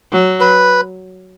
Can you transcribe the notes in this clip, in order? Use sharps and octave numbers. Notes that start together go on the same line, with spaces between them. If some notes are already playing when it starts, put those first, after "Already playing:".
F#3
B4